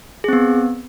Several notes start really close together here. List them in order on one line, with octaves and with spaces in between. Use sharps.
G#4 C4 B3